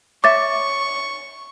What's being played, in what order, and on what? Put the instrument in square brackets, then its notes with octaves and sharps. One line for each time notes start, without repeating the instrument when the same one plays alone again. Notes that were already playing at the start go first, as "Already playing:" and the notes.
[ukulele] C#5 E5 [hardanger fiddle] C#6 [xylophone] D6 A6